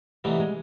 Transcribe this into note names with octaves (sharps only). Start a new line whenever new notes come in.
C3 E3 G3 A3 B3 D#4
G#3